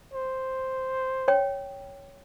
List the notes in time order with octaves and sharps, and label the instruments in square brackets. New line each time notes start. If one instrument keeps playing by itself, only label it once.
[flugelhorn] C5
[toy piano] C#5 G5